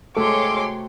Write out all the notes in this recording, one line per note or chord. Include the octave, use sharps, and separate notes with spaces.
C3 G#3 A3 F#4 A4 C#5 C6 D6